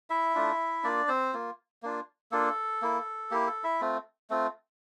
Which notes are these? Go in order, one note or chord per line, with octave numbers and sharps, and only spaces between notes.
E4 E5
A3 D4 F4
A#3 D4 F4 D5
C4 C5
A#3 F4
A#3 D4 F4
A#3 D4 F4 A4
A#3 E4
A#3 E4 G4
A4
E4 E5
A3 C4 F4
A3 C4 F4